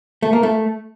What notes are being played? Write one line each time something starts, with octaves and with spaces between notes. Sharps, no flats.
A3
A#3
A3